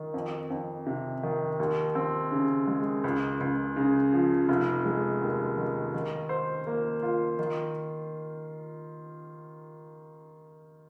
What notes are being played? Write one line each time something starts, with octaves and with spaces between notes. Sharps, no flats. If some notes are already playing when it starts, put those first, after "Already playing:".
Already playing: D#3
F2
F2
C3
D#3
D#2
C4
C#3
G#3
C#2
C#2
C#3
F3
F1
G#3
D#2
D#3
D#3
C5
A#3
F4
D#3